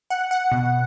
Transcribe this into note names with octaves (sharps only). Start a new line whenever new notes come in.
F#5
F#5
B2